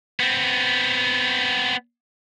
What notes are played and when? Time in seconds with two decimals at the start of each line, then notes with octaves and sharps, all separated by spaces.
0.20 B3 C4